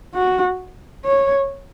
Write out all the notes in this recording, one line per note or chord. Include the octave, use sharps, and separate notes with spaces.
F#4
C#5